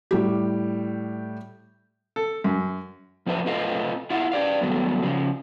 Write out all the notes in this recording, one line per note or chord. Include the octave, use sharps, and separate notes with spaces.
A2 G3 G4
A4
F#2
F3 C4 B4 E5
A3 C4 F4 B4 D#5 F5
E4 F4 E5 F#5
G4 D5 F5
D#3 F#3 G3 A3 B3
C#3 F3